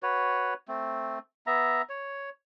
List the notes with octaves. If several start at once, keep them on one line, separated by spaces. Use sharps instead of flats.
F#4 B4 C#5
A3 C4
B3 E5 A#5
C#5